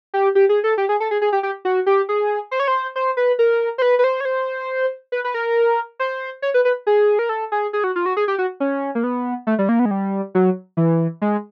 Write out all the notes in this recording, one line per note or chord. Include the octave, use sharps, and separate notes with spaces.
G4
G4
G#4
A4
G4
G#4
A4
G#4
G#4
G4
G4
F#4
G4
G#4
C5
C#5
C5
C5
B4
A#4
C5
B4
B4
C5
C#5
C5
B4
B4
A#4
C5
C#5
B4
B4
G#4
A#4
A4
G#4
G#4
F#4
F4
F#4
G#4
G4
F#4
C#4
A#3
B3
A3
G3
A#3
B3
G#3
G3
F#3
E3
G#3